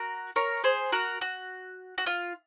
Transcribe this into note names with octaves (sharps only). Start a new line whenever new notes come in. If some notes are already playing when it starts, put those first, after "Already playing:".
Already playing: F#4 A#4
A#4 C#5
G#4 C5
F#4 A#4
F#4
F#4
F4